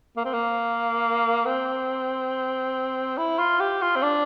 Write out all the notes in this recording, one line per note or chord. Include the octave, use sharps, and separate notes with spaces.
A#3
C4
A#3
C4
E4
F4
G4
F4
C4
D4